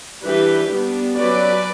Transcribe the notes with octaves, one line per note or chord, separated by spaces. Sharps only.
E3 G3 D4 G4 B4
G3 B3 D4
F#3 C#4 B4 D5